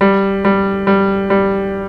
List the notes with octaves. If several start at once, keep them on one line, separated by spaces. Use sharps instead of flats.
G3
G3
G3
G3